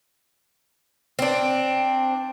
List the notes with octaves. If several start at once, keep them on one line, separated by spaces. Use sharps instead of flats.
C4 D4